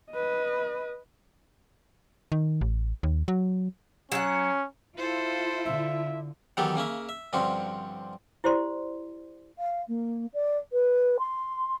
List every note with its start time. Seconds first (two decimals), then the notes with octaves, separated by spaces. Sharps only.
0.11 B4 D#5
2.32 D#3
2.61 A1
3.03 D#2
3.28 F#3
4.12 F#3 C#4 F#5
4.97 E4 F4 A4 C5
5.65 D3 E5
6.57 D#3 E3 F#3 B3 G4 A4
6.76 C#3 A#3 C#4 E5
7.09 E5
7.33 G2 D3 F3 C4 C#4 F#4
8.44 E4 G4 C5 D5 C6
9.57 F5
9.88 A#3
10.33 D5
10.72 B4
11.19 C6